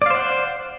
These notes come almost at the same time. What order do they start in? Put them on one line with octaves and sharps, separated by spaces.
D5 F5 C5 F#5